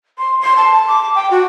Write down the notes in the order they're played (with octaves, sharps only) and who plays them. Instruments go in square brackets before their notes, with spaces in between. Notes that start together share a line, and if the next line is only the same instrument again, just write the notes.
[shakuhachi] C6
C6
A5
D6
G5
F#4